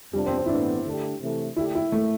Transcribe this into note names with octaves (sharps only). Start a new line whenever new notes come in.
F2 C3 F3 G3 B3 D4
C4
C4
E4
A2 E3 B3 D4
D3 A3 D4 G4
C3 E3 A3
D3 A3 D4 E4 G4
E4
A3